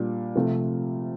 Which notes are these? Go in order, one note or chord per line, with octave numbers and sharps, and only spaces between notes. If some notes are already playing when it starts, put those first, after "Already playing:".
Already playing: A#2 G3 D4
C3 F3 A3